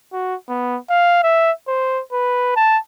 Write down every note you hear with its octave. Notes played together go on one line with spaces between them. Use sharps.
F#4
B3
F5
E5
C5
B4
A5